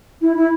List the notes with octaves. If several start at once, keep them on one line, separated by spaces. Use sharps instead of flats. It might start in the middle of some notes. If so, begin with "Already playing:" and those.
E4
E4